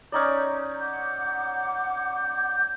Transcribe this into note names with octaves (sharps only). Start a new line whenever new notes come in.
C#4 D#4 D5 A#5 G6
F#5 D6 G6